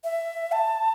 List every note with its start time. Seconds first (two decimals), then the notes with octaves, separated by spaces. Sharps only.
0.04 E5
0.52 A5